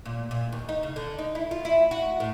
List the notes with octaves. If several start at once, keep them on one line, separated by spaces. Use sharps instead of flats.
A#2
A#2
D#2
D#4
C#3
D3
D#4
E4
F4
E4
F#4
A2